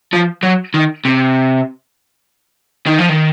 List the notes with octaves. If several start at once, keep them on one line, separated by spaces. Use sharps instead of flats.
F3
F#3
D#3
C3
D#3
F3
D#3